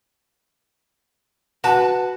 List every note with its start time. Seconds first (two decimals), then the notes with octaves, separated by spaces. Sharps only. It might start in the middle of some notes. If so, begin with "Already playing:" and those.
1.64 F#4 B4 A5